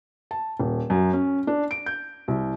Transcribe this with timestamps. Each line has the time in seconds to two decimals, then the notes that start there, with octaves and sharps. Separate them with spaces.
0.31 A5
0.60 D#1
0.90 F#2
1.13 C#4
1.47 D4
1.71 D7
1.86 G6
2.28 C2